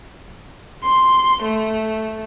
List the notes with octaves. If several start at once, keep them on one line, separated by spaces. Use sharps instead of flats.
C6
A3